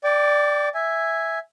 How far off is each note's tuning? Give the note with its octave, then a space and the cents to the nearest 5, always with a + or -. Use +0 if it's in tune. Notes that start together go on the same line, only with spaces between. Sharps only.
D5 +0 G5 +0 D6 -35
E5 +0 G#5 -5